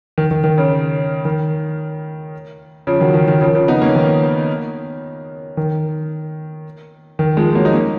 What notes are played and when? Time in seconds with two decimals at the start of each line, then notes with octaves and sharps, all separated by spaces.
0.18 D#3
0.31 D#3
0.44 D#3
0.58 C#3
1.25 D#3
2.87 C#3 F3
3.00 D#3 F#3
3.14 D#3
3.28 D#3
3.41 C#3 F3
3.55 C#3 F3
3.68 B3 D#4
3.81 A#3 C#4
3.95 D#3
5.57 D#3
7.19 D#3
7.37 F3 G#3
7.55 F#3 A#3
7.65 D#4
7.73 A#3 C#4